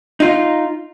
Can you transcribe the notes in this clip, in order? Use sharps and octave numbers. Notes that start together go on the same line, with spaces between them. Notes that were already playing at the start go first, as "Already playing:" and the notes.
D#4 F4